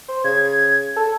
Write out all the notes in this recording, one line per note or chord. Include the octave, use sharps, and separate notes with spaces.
C5
C#3 G#6
A4